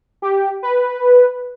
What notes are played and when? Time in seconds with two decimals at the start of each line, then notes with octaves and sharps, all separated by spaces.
0.22 G4
0.63 B4